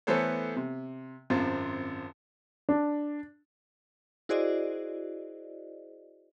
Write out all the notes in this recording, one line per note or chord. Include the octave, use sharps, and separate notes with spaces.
E3 A3 B3 A4 C5 C#5
C3
G#1 F#2 C4 F4
D4
E4 F#4 G#4 C5 D5 D#5